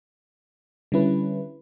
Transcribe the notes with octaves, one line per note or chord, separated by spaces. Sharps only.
D3 G3 C#4 E4 B4